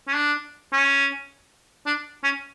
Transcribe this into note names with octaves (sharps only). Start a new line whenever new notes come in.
C#4
D4
C#4
D4
C#4